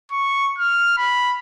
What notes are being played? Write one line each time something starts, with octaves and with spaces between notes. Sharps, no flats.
C#6
F6
B5